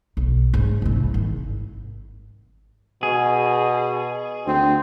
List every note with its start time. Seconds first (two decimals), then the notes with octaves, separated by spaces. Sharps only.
0.17 B1
0.54 G#2 C#3
0.82 C2 C4
1.14 G#1
3.03 B2 G#4
4.47 D2 C4